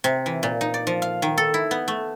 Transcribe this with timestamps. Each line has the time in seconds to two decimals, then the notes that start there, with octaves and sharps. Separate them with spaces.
0.04 C3
0.26 E3
0.43 A#2
0.61 D#4
0.74 D5
0.87 F3
1.02 F5
1.22 D#3
1.38 A4
1.54 E4
1.71 B3
1.88 A3